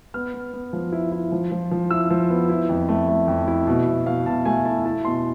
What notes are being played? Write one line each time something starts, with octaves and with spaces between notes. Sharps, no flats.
B3 F6
B3
B3
F3
E4
E4
F3
F3
F3
E4 E6
F3
B3
E4
F2
A3
A3
F2
E4
B2
B2 E5
B2 F5
B2 A5
A3 G#5
E4 A5
E4 A5
B2 C6